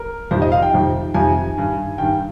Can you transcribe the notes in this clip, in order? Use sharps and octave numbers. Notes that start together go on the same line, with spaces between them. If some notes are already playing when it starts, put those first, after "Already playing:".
Already playing: A#4
F2 C3 D#3 C5
D#5
F5
G5
F2 C3 D#3
F2 C3 D#3 G#5
G2 D#3
G2 D#3 G5